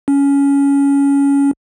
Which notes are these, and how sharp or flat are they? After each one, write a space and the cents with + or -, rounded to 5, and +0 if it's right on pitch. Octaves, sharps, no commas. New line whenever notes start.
C#4 +15